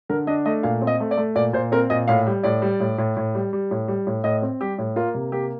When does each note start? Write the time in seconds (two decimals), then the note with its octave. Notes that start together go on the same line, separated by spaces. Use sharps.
0.09 D3 A#4
0.27 D4 D#5
0.45 A3 D#5
0.63 A#2 F5
0.82 C4
0.87 D#5
1.00 A3
1.11 D5
1.17 A3
1.36 A#2 D5
1.53 A#2 C5
1.72 C4 A#4
1.90 A#2 D#5
2.08 A2 F5
2.26 G3
2.43 A2 D5
2.62 G3
2.80 A2
2.98 A2
3.17 A2
3.35 G3
3.53 G3
3.71 A2
3.88 G3
4.07 A2
4.24 A2 D#5
4.42 C4
4.61 G3 G4
4.78 A2
4.96 A#3 F4
5.14 C3
5.32 A#3 G4